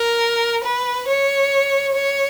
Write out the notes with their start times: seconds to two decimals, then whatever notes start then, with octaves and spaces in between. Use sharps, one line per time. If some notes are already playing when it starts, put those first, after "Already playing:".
Already playing: A#4
0.64 B4
1.07 C#5
1.94 C#5